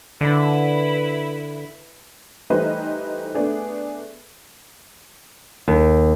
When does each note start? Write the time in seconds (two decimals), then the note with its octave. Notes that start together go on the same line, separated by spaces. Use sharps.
0.21 D3 E4 B4 B5
2.50 E3 G3 A3 D#4 B4 C5
3.34 A3 B3 D4 G#4
5.68 D#2